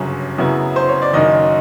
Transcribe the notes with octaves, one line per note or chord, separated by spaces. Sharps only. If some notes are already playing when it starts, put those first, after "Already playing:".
Already playing: G1 F#2 C#3 F#3
F#2 C#3 F#3 B3 E4
C5
C#5
D5
F#1 F#2 D#3 D#5